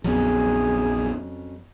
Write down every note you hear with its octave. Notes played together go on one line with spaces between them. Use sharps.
A#1 F2 F#3 B3 C#4 G#4